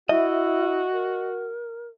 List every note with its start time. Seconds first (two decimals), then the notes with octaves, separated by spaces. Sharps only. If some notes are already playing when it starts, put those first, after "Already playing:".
0.09 E4 F#4 D#5 E5
0.93 A#4